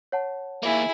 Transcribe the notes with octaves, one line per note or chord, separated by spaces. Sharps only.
C#5 F#5 A5
D#2 A#3 E4 G#4 E5